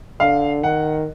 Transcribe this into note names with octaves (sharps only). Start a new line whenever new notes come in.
D3 F5
D#3 F#5